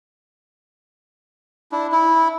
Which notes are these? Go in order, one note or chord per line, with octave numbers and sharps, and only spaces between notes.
D4 E4
E4